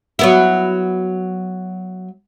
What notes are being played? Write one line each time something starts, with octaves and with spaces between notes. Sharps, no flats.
F#3 B3 E4